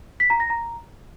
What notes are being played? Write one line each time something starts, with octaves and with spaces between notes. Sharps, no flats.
B6
A#5
A#6
A#5